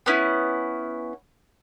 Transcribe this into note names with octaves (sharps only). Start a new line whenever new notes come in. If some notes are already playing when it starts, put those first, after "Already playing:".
B3 C#4 E4